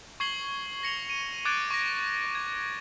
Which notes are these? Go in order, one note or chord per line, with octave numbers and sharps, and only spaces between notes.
C#6 G#6 C7 F#7 G7
A#6 C#7 F7 G7
D#7
D6 F#6 G#6 A6 D7
C#6 A#6
G#6